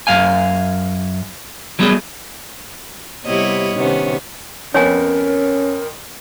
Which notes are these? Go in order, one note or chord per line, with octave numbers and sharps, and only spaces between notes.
F#2 F5 G#5
F#3 G3 A3 B3 G#4
C3 G3 B3 E4 C#5 D#5
C3 D#3 B3 C#4
F2 B3 C#4 A#4 C#5 G#5